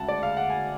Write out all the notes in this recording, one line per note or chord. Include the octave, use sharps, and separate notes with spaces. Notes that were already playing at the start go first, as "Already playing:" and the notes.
Already playing: D2 C#3 G#3 F#5 A5
D5
F5
F#5
G#5